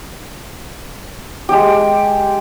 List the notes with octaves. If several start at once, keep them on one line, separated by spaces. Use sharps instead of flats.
G#3 G4